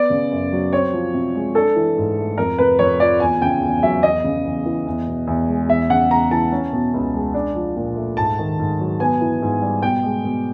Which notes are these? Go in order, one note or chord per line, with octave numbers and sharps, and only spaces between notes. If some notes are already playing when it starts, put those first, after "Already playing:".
Already playing: B3 D5
C#3
F#2
F#3
C4 C#5
F3
C3
G#3
D4 A4
E3
G#2
A3
F2 A#4
C3 B4
F2 C#5
F3 D5
E2 G#5
C#3 G5
E2
F#3 E5
E2 D#5
C#3
E2
E3
E2
B2
E2
G#3
E2 E5
C#3 F#5
E2 A#5
E3 A5
C#4
B2
C#2
G#3
D4
F3
A#2
A3
G#2 A5
D#3
G#2
F#3
B3 G#5
E3
G#2
G3
B2 G5
G#3
B2